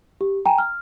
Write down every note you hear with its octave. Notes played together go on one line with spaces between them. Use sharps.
G4
G5 G#5 A#5
F6